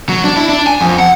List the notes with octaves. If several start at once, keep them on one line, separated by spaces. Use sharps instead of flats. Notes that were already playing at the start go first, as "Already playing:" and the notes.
F#3
D4
E4
D4
G#5
F2
F#5